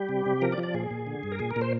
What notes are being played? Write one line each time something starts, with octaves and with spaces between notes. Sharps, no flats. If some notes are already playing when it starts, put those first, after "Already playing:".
Already playing: G3 G4
C3
C3
F3 A#4
D5
F3
D5
A#2 G#4
A#2
D3
G2
A#4
A#2 G#4
A#4
A#2
C5